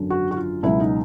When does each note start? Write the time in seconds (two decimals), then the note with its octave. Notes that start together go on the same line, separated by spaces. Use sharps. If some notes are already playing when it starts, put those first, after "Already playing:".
Already playing: G#1 F#2 D3
0.10 F#4
0.31 F#4
0.37 F4
0.63 C#2 B2 F#3 E4
0.80 D#4